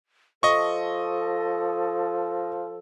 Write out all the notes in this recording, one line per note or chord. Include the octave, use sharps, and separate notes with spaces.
F3 A4 D#5 C#6